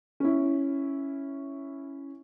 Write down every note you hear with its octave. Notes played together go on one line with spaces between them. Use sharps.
C#4 E4